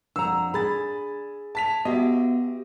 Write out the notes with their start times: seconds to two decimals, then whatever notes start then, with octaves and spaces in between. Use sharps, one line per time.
0.16 F2 D4 F#5 A#5 E6
0.54 G#4 G#5 B5 A6
1.55 A5 B6 F7
1.85 B3 F#4 G4 D#5 E5